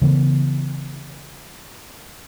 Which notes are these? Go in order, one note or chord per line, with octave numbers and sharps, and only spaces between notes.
C#3 E3 B3